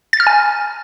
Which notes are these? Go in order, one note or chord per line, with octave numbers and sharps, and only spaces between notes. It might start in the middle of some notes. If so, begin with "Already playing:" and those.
A6
F6
G#5